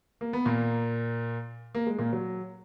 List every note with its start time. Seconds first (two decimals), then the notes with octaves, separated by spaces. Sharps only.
0.21 A#3
0.33 B3
0.45 A#2 A#3
1.75 A#3
1.87 G#3
1.98 A#2 A#3
2.13 F#3